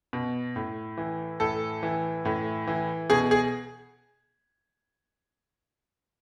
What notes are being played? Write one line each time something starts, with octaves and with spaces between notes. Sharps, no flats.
B2
A2
E3
A2 A4
E3
A2
E3
B2 G#4
G#4